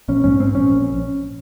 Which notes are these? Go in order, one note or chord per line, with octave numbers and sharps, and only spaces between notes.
A#1 C#4
G#2 C#4
G#2 C4
A#1 C#4
A#1